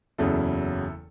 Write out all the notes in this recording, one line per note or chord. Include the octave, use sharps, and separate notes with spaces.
F#1 E2 C#3 F#3 E4 A4